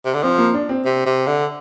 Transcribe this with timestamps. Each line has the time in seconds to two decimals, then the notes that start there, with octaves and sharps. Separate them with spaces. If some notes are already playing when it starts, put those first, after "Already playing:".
0.05 C3
0.14 D3
0.23 F3 C4
0.38 A#3
0.54 D4
0.69 C4
0.85 C3
1.06 C3
1.27 D3